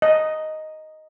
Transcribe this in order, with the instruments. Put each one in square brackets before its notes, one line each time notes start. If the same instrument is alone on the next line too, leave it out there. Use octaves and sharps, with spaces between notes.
[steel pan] D#5